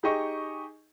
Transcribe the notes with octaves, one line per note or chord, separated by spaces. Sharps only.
D#4 G4 G#4 D#5 C#6